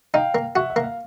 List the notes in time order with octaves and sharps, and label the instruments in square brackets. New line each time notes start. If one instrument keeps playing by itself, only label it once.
[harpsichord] D#4 [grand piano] F5 G5
[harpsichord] A#3
[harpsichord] F#4 [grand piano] E5 F#5
[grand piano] E5
[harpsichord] A#3
[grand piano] F5